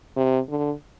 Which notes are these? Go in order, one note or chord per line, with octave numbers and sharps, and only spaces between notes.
C3
D3